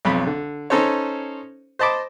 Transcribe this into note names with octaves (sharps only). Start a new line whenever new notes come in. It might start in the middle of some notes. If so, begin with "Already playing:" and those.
B1 F2 B5
D3
C#4 D#4 A4 C5 C#5
C5 D#5 A5 B5 D6